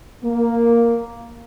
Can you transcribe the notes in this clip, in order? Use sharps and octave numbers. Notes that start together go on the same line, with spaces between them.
A#3